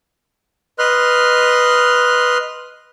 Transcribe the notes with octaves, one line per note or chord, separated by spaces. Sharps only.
B4 D#5 C6 F6 F#6